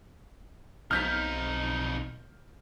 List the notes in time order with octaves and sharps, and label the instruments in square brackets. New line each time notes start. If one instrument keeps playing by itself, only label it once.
[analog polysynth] B1 [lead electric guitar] F2 D#4 [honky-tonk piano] F6 G6 B6